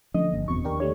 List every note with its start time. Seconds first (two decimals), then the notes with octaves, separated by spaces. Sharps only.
0.14 D3 F3 A3 C#4 D#5
0.31 G1 F#2 A#3
0.48 F#1 E2 B2 C4 C#6
0.65 D#2 D4 G4 A#4
0.80 D3 G3 A3 C#5